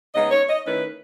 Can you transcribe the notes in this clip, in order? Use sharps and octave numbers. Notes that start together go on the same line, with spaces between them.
C#3 G#3 B3 D#4 D#5
C#5
D#5
D#3 A3 C#4 E4 B4